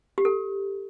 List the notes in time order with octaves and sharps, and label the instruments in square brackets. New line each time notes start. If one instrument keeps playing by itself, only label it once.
[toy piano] G4
A4